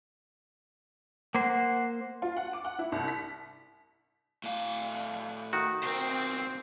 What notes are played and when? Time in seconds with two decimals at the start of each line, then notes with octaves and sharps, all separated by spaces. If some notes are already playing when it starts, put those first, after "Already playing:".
1.35 A#3 C5 F#5
2.22 F4
2.36 F#5
2.53 D6
2.65 F#5
2.79 E4
2.92 C2
3.08 B6
4.44 A2 F5
5.53 D#3 F#4
5.84 B2 C4 A#4 C5